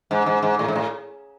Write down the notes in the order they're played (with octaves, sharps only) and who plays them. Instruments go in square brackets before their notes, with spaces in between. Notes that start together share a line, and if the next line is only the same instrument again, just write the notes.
[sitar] G#2
G#2
G#2
A2
G#2
A2